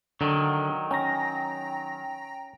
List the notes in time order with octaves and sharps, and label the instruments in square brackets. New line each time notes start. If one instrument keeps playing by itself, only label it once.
[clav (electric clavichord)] D3 [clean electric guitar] D#3 F#3
[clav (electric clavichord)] C#4 [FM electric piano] G5 A#5 A#6